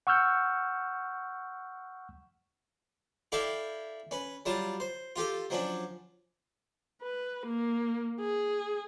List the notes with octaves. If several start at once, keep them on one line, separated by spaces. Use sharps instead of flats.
F#5 C#6 E6 F6 G6
E4 A4 D5 E5 F5 G5
C#4 B4
F#3 G3 F4 A5
C5
F4 G4 A4
F3 F#3 C#4 D4
B4
A#3
G#4